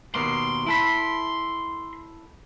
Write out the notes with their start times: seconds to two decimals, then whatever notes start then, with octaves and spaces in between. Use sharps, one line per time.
0.14 D#2 B2 A#3 C6
0.67 E4 A4 B5